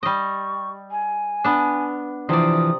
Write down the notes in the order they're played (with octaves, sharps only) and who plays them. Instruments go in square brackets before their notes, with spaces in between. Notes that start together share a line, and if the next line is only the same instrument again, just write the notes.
[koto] G3 D#5 [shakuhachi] C#6
[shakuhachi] G#5
[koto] B3 D4
[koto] C3 D5 [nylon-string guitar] E3 F3 D4 [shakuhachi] D#6